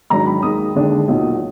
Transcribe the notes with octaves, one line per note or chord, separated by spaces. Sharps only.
G#2 D#3 F#3 D4 A#5
B5
D#2 D#3 G#3 D#6
D#2 D3 G#3 D4
B1 A#2 F#3